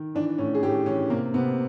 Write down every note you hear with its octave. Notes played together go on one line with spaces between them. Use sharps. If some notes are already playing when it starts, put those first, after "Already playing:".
Already playing: D#3
E3 D4
A2 C#4
G#4
A2 G4
E3 C#4
C3 A#3
C3 B3